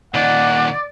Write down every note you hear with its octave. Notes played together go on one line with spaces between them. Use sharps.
A#2 D#3 D5 F#5